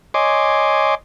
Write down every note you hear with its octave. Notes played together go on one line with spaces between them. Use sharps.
C#5 D#5 G#5 C6 D6